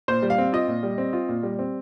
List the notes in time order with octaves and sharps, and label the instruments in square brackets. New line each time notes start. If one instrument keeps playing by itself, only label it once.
[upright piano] A#2 [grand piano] C5
[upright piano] G3
[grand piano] F5
[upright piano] C4
[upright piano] F4 [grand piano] D#5
[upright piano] A#2
G3
C4
F4
A#2
G3
C4